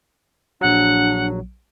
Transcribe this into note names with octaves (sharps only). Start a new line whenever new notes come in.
A#1 F#3 D4 F#5